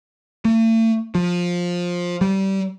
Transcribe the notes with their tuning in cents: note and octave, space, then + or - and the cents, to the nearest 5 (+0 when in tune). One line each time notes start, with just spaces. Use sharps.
A3 +40
F3 +15
G3 -25